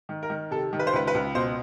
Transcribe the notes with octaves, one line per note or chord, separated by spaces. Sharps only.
D#3
A#4
D#3
C3 A4
D#3
B4
C5
C#2 B4
B4
C#2
B2 C5